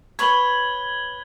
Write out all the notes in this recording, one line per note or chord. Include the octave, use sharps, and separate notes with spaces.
B4 C#5 B5 G#6 F#7 G7